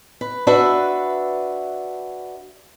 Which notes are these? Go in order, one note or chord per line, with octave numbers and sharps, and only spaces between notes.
B4
D4 F#4 B4 E5